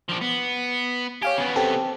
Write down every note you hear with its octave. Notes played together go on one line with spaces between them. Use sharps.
F3 D4
B3
G4 C#5 F5 G#5
C#3 B3
C4 G4 A4